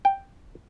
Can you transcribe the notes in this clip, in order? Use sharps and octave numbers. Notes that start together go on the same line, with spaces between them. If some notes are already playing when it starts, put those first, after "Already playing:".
G5